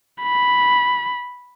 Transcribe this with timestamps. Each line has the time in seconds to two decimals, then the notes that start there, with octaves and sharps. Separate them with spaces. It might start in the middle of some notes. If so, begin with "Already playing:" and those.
0.23 B5